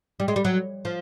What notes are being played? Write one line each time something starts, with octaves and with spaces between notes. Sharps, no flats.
G3
G#3
G3
F#3
F3